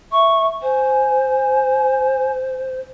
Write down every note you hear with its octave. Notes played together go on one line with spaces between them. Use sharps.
E5 C#6
C5 G#5